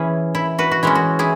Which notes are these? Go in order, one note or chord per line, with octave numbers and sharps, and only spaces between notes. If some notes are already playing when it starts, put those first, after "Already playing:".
Already playing: E3 C#4 E4 G#4
E4
F#4 B4
F#4
E3 G#3 C#4 E4
F#4
E4 G#4